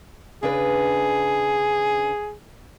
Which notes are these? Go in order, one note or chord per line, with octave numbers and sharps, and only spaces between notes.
C#3 D4 G#4 B4